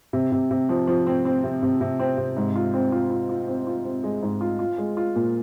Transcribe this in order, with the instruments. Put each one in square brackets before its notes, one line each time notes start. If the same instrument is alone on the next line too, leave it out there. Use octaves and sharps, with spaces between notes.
[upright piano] C3
C3
C3
F3
F3
C4
C4
C3
C3
C3
C4
C3
G#2
F4
C4
F4
F4
F4
C4
F4
C4
G#3
G#2
F4
F4
G#3
F4
A#2